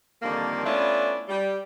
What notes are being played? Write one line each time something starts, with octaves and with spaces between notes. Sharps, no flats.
F2 D3 D#3 G3 A#3
A3 B3 C#4 D4 E4 F4
G3